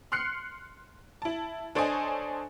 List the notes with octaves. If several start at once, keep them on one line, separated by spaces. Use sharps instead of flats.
C6 F6 F#6 C7 C#7
E4 A5
D4 A4 C5 C#5 D#5 G#5